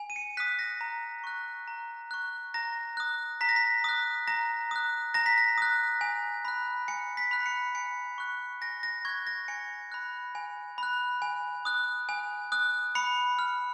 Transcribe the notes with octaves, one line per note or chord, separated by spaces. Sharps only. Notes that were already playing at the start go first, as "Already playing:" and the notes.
Already playing: G#5
D#7
C#7
D#6 F#6 B6
A#6
A#5
C#6 F#6
A#5
C#6 F#6
A#5 A#6
D#6 F#6
A#5 B6
A#6
B6
D#6 F#6
A#5 A#6
D#6 F#6
A#5 A#6
B6
A#6
D#6 F#6
G#5
B5 F#6
G#5 C#7
B6
B5 F#6
C#7
G#5 C#7
C#6 F#6
G#5 A#6
A#6
C#6 F#6 G#6
A#6
G#5 C#7
B5 F#6
G#5
B5 F#6
G#5
D#6 F#6
G#5
D#6 F#6
B5 C#7
F6